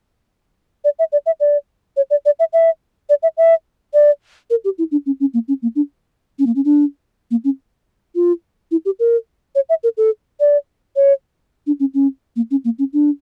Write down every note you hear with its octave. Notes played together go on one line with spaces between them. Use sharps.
D5
E5
D5
E5
D5
C#5
D5
D5
E5
E5
D5
E5
E5
D5
A#4
G4
E4
D4
C#4
C#4
A#3
C#4
A#3
D4
C#4
A#3
C#4
D4
A#3
C#4
F4
E4
G4
A#4
C#5
E5
A#4
A4
D5
C#5
D4
C#4
C#4
A#3
C#4
A#3
C#4
D4